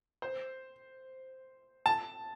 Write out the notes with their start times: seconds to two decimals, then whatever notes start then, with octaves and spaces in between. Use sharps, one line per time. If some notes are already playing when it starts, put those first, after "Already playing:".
0.22 C5
1.86 A5